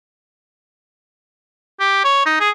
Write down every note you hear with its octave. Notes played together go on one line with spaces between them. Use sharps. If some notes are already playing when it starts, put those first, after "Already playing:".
G4
C#5
D#4
G#4